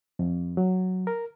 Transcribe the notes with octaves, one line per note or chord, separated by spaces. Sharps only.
F2
F#3
A#4